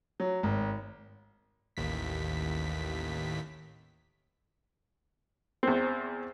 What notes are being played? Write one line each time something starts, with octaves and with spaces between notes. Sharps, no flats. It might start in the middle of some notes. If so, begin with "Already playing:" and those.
F#3
G#1
A1 D#2 B6
E2 C4